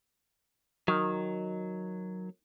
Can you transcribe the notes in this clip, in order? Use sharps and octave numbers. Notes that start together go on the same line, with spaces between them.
D#3 F#3